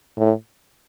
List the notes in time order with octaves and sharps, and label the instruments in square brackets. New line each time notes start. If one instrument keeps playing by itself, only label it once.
[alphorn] A2